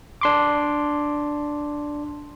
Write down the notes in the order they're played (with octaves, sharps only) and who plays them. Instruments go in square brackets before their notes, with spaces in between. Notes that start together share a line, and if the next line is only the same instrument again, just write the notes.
[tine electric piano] D4 C6 D6